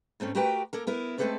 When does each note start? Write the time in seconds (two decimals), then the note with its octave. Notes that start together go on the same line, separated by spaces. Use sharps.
0.20 G#2 A3 C4 C#4
0.35 A3 F#4 G4 A#4 B4 G5
0.73 A#3 A4 A#4
0.87 B3 E4 A#4
1.18 G#3 A3 C4 A4 B4 D5